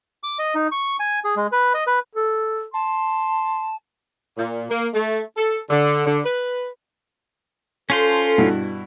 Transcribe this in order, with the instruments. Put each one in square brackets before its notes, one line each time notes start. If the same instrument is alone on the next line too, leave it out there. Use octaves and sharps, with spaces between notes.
[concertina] D6
D#5
D#4
C#6
G#5
G#4
G#3
B4
D#5
B4
[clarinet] A4
[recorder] A5 [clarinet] C6
[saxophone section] A#2
A#3
A3
A4
D3
D3
B4
[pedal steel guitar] C#4 F4 C5 [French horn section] A4
[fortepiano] G2 B2 E4